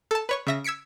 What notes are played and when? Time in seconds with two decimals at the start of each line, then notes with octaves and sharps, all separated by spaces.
0.11 A4 A5
0.29 B4 C#5 C#6
0.47 C#3 E5 A#6
0.64 E6 G#6 B6 C#7 D7